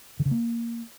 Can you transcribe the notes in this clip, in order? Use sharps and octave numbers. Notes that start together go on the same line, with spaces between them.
D3
C#3
A#3